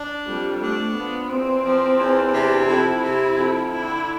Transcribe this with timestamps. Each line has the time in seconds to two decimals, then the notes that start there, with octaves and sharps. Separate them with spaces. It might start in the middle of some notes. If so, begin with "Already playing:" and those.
Already playing: D4
0.26 F2 G3
0.61 A3 D4
0.95 F3 B3
1.29 E2 C4
1.64 F3
1.98 E2
2.32 C3 D4
2.66 F2 E4
3.00 C3 E4
3.35 F2
3.69 D3 E4